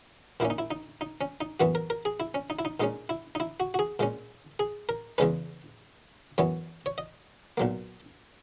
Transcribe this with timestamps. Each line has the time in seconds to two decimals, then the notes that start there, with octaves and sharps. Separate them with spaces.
0.40 A#2 A#3 C#4 E4
0.50 D#4
0.58 E4
0.71 D#4
1.01 D#4
1.21 C#4
1.41 D#4
1.60 F#2 E3 B3 F#4
1.75 A#4
1.90 A#4
2.05 G#4
2.20 E4
2.34 C#4
2.50 D#4
2.59 E4
2.65 D#4
2.80 A#2 G#3 C#4 D#4
3.09 E4
3.35 D#4
3.40 E4
3.60 F#4
3.74 F#4
3.79 G#4
3.99 A#2 G#3 C#4
4.59 G#4
4.89 A#4
5.18 E2 C#3 G#3 C#4 B4
6.38 F#2 E3 B3 C#5
6.86 C#5
6.98 D#5
7.57 B1 A#2 F#3 A#3